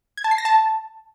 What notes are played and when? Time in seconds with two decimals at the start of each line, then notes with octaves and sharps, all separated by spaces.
0.17 G#6
0.24 A5
0.31 C7
0.38 A#6
0.45 A5